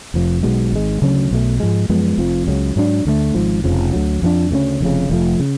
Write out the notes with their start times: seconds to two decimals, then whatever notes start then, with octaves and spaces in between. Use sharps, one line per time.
0.14 F1 F2 F3
0.43 B1 B2 G#3
0.72 G#1 G#2 G#3
1.02 D2 C#3 F#3 C#4
1.31 B1 B2 A3
1.60 G#2 F3 G#3
1.89 F#2 F3 G#3 B3
2.18 F1 F2 F3
2.48 C#2 C#3 F#3 C#4
2.76 G#2 F#3 A3 D4
3.05 D2 D3 F3 A3
3.34 G#1 G#2 F3
3.64 F1 F2 C#3 F3
3.93 D2 D3 F#3
4.22 F2 F3 A3 D4
4.51 D2 C#3 G#3 C#4
4.80 F1 F2 C#3
5.10 F1 F2 F3 A3
5.40 C#3